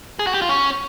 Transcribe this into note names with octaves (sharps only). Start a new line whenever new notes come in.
G#4
F#4
G4
F4
C#4